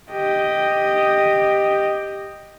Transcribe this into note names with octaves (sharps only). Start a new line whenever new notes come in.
G4 D#5